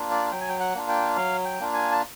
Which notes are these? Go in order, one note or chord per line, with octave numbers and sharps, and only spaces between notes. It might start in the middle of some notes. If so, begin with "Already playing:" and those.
Already playing: A#3 D4 F4
D5
F#3 G5
G#5
G5
F#5
A#3 D4 F4
G5
F#3 F5
G5
A#3 D4 F4
G#5
A5